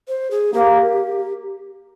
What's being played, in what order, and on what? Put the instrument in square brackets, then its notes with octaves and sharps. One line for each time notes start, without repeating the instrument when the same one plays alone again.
[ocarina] C5
G#4
[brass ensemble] A#3 [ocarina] G4